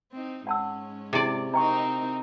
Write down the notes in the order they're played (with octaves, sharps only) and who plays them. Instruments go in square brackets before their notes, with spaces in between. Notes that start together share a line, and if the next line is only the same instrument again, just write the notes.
[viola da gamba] C4 D#4
[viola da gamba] G#2 C#4 [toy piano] F#5 A5 E6
[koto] C3 D5 [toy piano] E4 G#4
[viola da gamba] C4 D#4 A#4 [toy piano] D#5 G5 C#6 [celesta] A#5